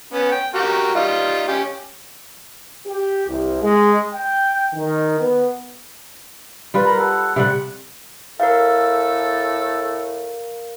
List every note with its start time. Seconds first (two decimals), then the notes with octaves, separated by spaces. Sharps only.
0.13 B3 C#4
0.32 G5
0.54 F#4 G4 A#4
0.95 G3 D#4 F4
1.48 C#4 G4
2.87 G4
3.28 C2
3.62 G#3
4.13 G5
4.74 D#3
5.19 B3
6.74 G3 F4 B4
6.85 A#4 A#5 B5
6.98 A4 F#5
7.36 C3 G3 F#5
8.40 A2 A4 A#4 F5